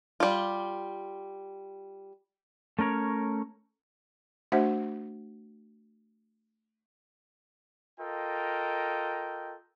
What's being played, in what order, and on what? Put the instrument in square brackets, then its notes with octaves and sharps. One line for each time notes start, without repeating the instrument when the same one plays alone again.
[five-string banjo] G3 F4
[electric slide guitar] A3 C#4 A#4 C#5
[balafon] A3 D4 F#4 C5 E5 F#5
[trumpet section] F4 A4 A#4 D#5 G5